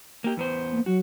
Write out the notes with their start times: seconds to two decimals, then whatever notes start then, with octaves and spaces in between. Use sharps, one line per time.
0.24 A#3 G4
0.37 E2 B3 C5
0.72 A#3
0.86 F#3 F#4